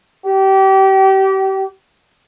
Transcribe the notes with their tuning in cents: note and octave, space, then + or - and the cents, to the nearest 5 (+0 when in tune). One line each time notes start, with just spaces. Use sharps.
G4 -30